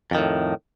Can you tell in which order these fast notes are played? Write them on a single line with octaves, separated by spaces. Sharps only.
F2 D#3 A2